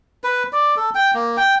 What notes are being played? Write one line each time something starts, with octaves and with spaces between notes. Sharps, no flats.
B4
D5
A4
G5
A#3
G5